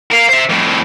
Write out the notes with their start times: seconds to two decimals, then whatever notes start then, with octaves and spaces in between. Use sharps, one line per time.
0.12 A#4 F5
0.29 C5 E5
0.49 F2 A2